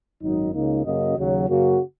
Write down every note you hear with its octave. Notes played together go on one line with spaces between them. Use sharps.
G#1 F#2 F#3 D#4
C#2 C#3 A#3 D#4
F#2 C#3 A#3 F#4 D#5
D#2 C#3 F#3
F#2 C#3 A#3 F#4